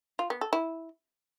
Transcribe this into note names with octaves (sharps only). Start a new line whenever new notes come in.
F4
B3
A4
E4